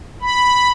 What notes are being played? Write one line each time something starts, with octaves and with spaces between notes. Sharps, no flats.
B5